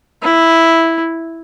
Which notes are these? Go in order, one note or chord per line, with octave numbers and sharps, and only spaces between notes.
E4